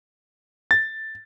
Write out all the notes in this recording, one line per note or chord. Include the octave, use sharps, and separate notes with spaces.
A6